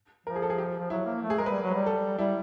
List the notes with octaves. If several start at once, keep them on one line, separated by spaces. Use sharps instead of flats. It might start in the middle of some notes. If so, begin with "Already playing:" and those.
F3 A#4
G#4
A4
G#4
G4
F3
F#3 E4
A#3
A3
G#4
G#3 A#4
B4
G3
F#3
B4
G3
A4
G3 E4